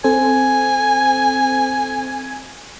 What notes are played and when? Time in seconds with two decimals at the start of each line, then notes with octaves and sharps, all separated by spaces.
0.04 C4 A4 C5 G#5